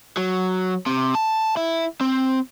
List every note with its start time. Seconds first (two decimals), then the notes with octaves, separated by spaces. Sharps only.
0.17 F#3
0.86 C3
1.15 A5
1.57 E4
2.01 C4